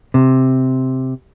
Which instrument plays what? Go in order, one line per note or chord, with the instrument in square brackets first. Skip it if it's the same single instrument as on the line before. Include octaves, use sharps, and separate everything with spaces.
[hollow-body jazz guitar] C3